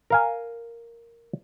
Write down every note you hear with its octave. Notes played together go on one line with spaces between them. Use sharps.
A#4 F5 G#5